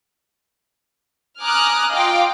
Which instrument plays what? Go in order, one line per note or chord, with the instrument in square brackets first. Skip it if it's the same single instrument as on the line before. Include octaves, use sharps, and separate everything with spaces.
[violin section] G#5 A#5 D6 D#6 F6 F#6
F4 D#5 F5 G5 D6